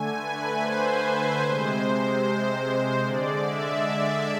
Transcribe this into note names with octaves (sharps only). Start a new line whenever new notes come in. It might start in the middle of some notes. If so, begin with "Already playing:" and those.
Already playing: D3 A3 G#5
B4
C5
B4
C3 G#3 C5
D3 G#3 D5
E5
D5